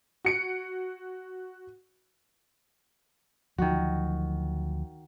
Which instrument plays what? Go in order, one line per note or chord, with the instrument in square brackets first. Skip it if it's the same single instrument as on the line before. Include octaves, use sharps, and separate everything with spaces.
[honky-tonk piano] F#4 C#7 D7
[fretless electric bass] D2 F3 F#3 [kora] D#3 F#4